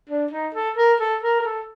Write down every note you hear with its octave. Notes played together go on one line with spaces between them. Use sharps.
D4
D#4
A4
A#4
A4
A#4
A#4
A4